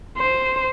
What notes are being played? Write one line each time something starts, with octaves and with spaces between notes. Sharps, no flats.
C5